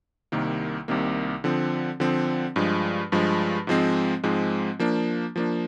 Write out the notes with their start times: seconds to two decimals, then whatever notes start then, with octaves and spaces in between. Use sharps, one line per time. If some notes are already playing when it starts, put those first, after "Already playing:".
0.32 C2 C3 D#3 A#3
0.88 C2 C3 D#3 A#3
1.44 D3 F3 C4
2.00 D3 F3 C4
2.56 G2 F3 G#3
3.12 G2 F3 G#3
3.67 G#2 F3 G#3 C4
4.24 G#2 F3 G#3 C4
4.79 F3 A#3 D4
5.36 F3 A#3 D4